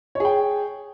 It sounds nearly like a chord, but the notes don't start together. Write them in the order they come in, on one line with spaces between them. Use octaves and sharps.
C#5 G#4 G5